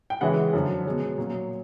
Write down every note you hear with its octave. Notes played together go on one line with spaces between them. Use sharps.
G5
C#3 E3 G#3 C#4 E4 F#5
F#2 D3 F3
B2 G#3 C#4
A#2 F#3 A#3 C#4